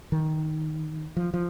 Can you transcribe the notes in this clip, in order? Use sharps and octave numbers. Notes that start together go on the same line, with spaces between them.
D#3
F3
F3